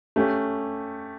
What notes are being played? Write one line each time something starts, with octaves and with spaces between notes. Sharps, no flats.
A3 C#4 G4